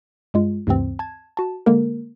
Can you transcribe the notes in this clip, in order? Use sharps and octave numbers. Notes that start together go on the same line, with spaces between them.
G2 G#3 F4
D2 G2 C3 E3 C4
A5 G#6
F#4 A5
D3 G#3 A#3 A#4